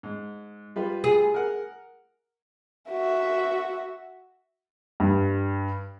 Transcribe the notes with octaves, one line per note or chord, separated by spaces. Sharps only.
G#2
G3 F4 B4
G#4
A#4 F#5
F#4 E5
G2